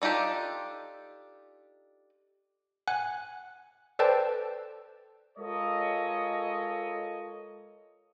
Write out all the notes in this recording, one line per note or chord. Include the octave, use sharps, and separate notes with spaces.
D4 D#4 F4 G4 A4
F#5 G#5 F#6
A4 B4 C5 D5 G5 A5
G#3 F4 A4 A#4 C#5 D#5